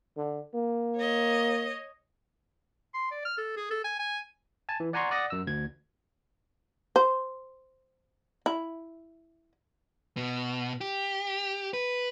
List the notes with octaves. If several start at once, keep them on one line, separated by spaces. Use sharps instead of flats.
D3
A#3
C#5 D#5
C6
D5
F6
A4
G#4
A4
G#5
G#5
G#5 A5
E3
D5 F#5 G#5 A#5 C6 C#6
D5 F#5 D#6 A#6
F#2 E6
D2 G#6
C5
E4
B2
G4
B4